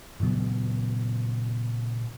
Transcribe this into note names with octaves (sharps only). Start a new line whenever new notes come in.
A#2 C#3 F#3 B3